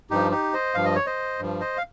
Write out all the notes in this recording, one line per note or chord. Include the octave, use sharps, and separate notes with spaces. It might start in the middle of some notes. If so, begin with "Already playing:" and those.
G2 F3 D#4 G4
D#4 G4
C5 D#5
G2 F3 F5
D#5
C#5
C5 D#5
G2 F3
C5 D#5
F5